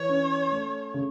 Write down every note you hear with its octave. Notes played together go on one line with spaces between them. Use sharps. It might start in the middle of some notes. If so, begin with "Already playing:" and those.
Already playing: E3 C#5
C#4
A3
C#3